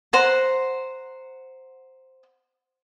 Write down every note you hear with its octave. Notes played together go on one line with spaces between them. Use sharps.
C5 F#5 A#5